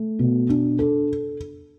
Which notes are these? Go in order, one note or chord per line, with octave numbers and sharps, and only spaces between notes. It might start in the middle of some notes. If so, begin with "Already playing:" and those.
Already playing: A3
B2
D4
A4